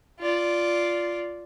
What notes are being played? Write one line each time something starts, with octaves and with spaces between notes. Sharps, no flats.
F4 D5